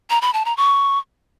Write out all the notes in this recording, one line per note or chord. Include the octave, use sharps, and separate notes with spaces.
A#5
B5
A5
A#5
C#6